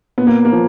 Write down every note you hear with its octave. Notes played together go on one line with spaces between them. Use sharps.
A#2 B3
A#3
A#3
F3